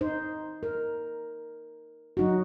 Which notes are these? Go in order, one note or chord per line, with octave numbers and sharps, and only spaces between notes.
D#4 C5
A#4
F#3 D#4 F#4